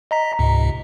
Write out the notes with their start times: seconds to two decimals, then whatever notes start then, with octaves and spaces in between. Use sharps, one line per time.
0.11 D#5 A#5 B6
0.39 C#2 G#2 C3